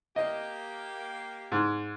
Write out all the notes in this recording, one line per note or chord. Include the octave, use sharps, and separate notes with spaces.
A#3 G4 D#5
G#2